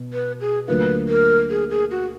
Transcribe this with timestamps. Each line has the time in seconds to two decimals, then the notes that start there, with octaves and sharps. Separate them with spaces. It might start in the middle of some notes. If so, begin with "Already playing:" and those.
Already playing: B2
0.13 B4
0.40 G#4
0.68 D2 D3 F#3 A#3 F4 B4
1.09 A#4
1.50 G#4
1.70 G#4
1.91 F#4